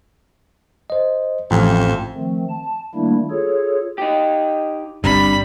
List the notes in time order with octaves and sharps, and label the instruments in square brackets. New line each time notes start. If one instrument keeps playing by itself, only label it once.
[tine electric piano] C5 D#5
[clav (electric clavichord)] A1 [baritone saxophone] F2 [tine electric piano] F3
[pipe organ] D#3 F3 A3 C4
A5
D#3 G3 A3 A#3 D4 E4
F4 G#4 A4 C#5
[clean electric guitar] D#4 G4
[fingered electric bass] G1 B2 C4 [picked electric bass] G2 [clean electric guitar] G3 [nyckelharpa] B5